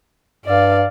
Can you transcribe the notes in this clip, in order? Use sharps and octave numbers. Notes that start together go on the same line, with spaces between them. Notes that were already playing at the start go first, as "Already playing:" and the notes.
G2 D5 F5